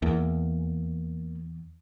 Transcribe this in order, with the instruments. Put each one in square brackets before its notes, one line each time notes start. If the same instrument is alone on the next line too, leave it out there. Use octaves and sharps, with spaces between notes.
[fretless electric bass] E2 [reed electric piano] A#3